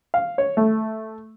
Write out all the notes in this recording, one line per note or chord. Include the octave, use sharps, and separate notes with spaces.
F5
C#5
A3